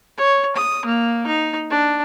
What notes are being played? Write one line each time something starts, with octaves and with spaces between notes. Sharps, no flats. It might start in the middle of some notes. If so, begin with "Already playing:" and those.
C#5
D#6
A#3
D#4
D4